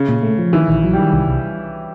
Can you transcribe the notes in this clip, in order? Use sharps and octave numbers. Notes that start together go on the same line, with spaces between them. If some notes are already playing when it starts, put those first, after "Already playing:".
Already playing: C#3
A#2
A3
F3
D#3 E3
A#1
F#3
D#3 G3
C2
C2